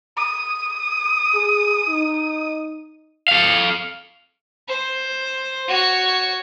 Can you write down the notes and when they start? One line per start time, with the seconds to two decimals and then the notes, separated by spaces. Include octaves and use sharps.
0.17 D#6
1.35 G#4
1.89 D#4
3.28 A4 F5
4.68 C5
5.68 F#4 C#5